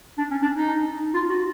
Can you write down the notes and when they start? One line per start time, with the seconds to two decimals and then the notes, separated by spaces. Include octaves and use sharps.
0.18 D4
0.31 C#4
0.42 D4
0.55 D#4
1.14 F4
1.30 F#4